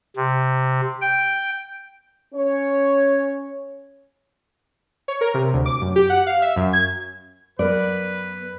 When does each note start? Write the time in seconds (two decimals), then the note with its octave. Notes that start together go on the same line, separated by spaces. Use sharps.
0.16 C3
1.01 G5
2.34 C#4 C#5
5.08 C#5
5.21 A#4
5.34 C3
5.54 D2
5.66 D6
5.81 F#2
5.96 G4
6.10 F#5
6.27 F5
6.42 E5
6.56 F#2
6.73 G#6
7.59 F#2 B3 A#4 B4 D5